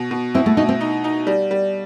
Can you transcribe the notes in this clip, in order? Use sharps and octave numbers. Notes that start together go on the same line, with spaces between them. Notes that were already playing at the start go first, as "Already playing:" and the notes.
Already playing: B2
B2
C4 E4
A3
B2 D#4
C4
D#4
D#4
G3
G3